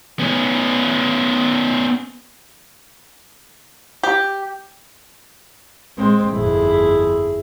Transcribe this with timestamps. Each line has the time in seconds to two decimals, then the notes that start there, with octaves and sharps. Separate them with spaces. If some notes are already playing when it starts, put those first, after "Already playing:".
0.19 B3 C#4
4.03 G4
5.97 G#3 C4
6.32 G1 F2 E4 G#4